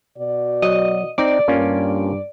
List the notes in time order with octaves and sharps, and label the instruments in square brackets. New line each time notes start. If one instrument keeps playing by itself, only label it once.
[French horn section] B2 F#4 D5
[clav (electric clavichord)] F#3 [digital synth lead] D#5
[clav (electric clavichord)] C4 D#4 [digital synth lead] D5
[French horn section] G2 [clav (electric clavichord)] A#3 C#4 F4